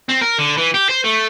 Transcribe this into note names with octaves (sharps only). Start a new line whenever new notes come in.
C4
A#4
D3
E3
G4
C5
A3